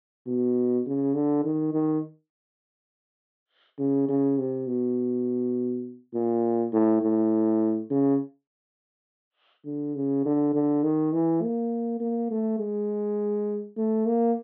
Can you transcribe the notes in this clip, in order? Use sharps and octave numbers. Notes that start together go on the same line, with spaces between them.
B2
C#3
D3
D#3
D#3
C#3
C#3
C3
B2
A#2
A2
A2
C#3
D3
C#3
D3
D3
D#3
E3
A#3
A#3
A3
G#3
A3
A#3